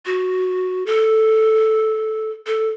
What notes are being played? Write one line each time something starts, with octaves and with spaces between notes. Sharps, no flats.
F#4
A4
A4